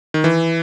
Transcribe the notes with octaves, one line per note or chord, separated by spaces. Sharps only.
D#3
E3